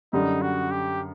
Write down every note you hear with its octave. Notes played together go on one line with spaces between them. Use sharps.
F#2 D3 G3 D#4
F#4
G4